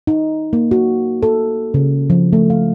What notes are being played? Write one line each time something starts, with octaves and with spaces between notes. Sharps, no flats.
D#4
A#3
F#4
A4
C#3
F3
A3
F5